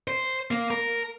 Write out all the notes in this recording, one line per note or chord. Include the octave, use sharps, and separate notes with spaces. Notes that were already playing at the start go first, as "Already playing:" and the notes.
C5
A#3
A#4